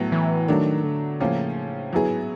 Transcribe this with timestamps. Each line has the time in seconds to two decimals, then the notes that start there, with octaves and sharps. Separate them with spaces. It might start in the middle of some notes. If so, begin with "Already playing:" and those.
Already playing: A2 F#3 B3
0.12 E3
0.48 D#3 F#3 A3 D4
0.84 D3
1.20 A2 C#3 F3 A#3 C#4
1.93 D3 F#3 B3 E4 G#4
2.10 G#2